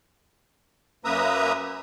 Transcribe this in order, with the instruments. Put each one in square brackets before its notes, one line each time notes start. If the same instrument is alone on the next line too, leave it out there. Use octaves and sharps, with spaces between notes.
[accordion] F#2 A#3 B4 E5 A#5 D#6